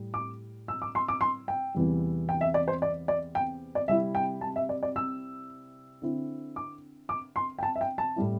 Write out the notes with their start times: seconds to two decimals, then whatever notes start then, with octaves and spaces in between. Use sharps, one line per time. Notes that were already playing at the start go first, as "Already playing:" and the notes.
Already playing: A2 G3
0.14 D6
0.68 E6
0.82 D6
0.95 C6
1.08 D6
1.21 C6
1.48 G5
1.75 E2 C3 E3 G3
2.29 G5
2.41 E5
2.54 D5
2.68 C5
2.82 D5
3.08 D5
3.35 G5
3.75 D5
3.88 C3 G3 E4 E5
4.15 G5
4.41 A5
4.56 E5
4.69 D5
4.83 D5
4.96 E6
6.02 D3 C4 E4
6.56 D6
7.09 D6
7.36 C6
7.59 G5
7.63 A5
7.76 E5
7.81 G5
7.98 A5
8.16 A2 G3 E4